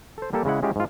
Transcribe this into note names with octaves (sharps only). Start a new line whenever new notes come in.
A4 C5
G3 A#3 G4 A4
C#3 G#3 E4 F#5
G#3 C#4 E4 F4 G4
G#2 F4